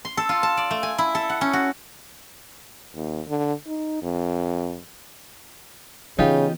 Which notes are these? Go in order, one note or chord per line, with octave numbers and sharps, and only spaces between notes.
C6
A4
F4
A5
D5
A3
G#5
E4
A4
F#5
C#4
F#4
D#2
D3
D#4
F2
C#3 E3 B3 D#4 F4 G4